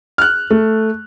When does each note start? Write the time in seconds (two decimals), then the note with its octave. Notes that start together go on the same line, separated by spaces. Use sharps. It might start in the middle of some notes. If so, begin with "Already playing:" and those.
0.18 F6 F#6
0.51 A3